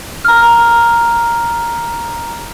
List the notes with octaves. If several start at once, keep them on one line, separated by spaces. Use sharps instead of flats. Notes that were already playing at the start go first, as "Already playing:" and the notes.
A#5 F6